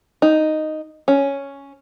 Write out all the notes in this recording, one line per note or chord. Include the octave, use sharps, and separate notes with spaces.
D#4
C#4